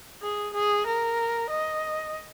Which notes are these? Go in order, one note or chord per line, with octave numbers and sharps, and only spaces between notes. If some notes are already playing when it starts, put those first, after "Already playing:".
G#4
G#4
A#4
D#5